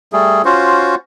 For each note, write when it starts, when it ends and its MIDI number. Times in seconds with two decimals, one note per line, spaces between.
0.13 0.42 55
0.13 0.42 57
0.13 0.42 68
0.45 0.95 61
0.45 0.95 65
0.45 0.95 66
0.45 0.95 72